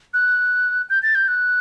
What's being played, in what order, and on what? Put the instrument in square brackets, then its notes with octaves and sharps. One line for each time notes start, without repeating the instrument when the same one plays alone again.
[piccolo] F#6
G6
A6
G6
F#6